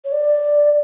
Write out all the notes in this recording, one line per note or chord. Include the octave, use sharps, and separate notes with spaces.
C#5
D5